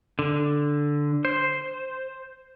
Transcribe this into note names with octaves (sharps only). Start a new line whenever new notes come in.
D3
C5